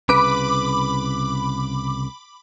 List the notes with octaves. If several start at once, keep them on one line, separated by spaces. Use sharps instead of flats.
C2 C#3 B4 B5 D6